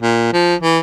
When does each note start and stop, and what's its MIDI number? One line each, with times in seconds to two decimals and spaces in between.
0.02 0.30 46
0.33 0.55 53
0.61 0.79 52